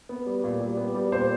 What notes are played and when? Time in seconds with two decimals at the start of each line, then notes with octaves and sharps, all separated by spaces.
0.09 B3
0.26 G3
0.44 A#2
0.60 G3
0.77 B3
0.94 G3
1.12 A#2 C5